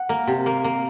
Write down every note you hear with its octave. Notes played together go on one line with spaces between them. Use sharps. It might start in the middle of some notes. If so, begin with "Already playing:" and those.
Already playing: F#5
A#3
C3
A#3
A#3